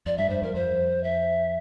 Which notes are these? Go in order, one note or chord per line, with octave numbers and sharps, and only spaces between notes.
F2 D5
G2 E5
G2 C5
F2 A#4
F2 C5
E5